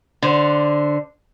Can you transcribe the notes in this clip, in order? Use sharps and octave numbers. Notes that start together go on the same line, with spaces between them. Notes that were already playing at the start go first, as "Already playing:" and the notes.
D3 C5